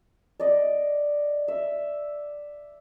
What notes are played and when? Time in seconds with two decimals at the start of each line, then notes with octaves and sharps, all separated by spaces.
0.40 D5 D#5
1.48 E5